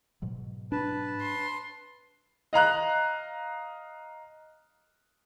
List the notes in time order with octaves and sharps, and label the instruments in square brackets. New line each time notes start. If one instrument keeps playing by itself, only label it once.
[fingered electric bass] G#2 B2 F#3
[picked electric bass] D4 [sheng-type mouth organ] B4 A5
[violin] C6
[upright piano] D#5 F5 A#5 F#6